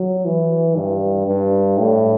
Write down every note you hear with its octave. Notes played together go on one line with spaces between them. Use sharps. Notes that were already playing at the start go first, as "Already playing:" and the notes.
Already playing: F#3
E3
G2
G2
A2